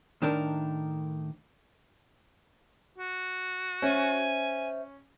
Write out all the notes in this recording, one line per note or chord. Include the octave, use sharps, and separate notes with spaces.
A2 D#3 D4 A#4
F#4
C#4 C5 E5 G#5